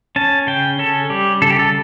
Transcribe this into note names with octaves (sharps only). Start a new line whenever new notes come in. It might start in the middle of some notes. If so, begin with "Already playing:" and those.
C#4 A5
C#3 G5
C#4 A4
G3 G4
C#3 A4
G4
A4